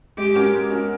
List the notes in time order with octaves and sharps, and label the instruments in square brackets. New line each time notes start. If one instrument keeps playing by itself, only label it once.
[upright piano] G#3 [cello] G4
[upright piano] C#4 F#4 A#4
G#3
C#4 F#4 A#4